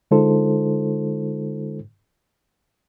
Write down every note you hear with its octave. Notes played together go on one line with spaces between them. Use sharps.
D3 G#3 D#4 F4 A4 C5